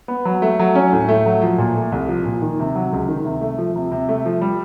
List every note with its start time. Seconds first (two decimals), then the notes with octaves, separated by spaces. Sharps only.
0.08 B3
0.25 F#3
0.42 A3
0.59 F#3
0.75 C#4
0.93 A2
1.09 A3
1.26 F#3
1.42 F3
1.58 A#2
1.75 A3
1.92 C2
2.08 F3
2.25 A#2
2.42 D#3
2.59 C3
2.75 F#3
2.93 C#2
3.09 D#3
3.25 C3
3.41 A3
3.58 F3
3.76 C3
3.91 C3
4.09 A3
4.25 F3
4.41 G3